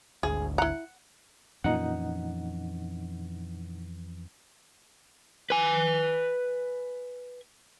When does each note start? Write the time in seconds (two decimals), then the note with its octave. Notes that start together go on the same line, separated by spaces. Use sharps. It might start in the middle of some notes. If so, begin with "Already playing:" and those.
0.23 G#1 D2 G#4
0.58 E4 F#5 A#5
1.64 F2 A#2 E3 C#4 D#4 F#5
5.50 B4 G#5